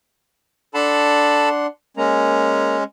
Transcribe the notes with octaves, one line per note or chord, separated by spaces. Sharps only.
D4 A4 F#5 A5 B5 C6
G#3 A#3 C#4 A#5